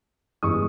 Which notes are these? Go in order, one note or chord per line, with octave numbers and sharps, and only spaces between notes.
G1 G2 E3 G#3 C#6 D#6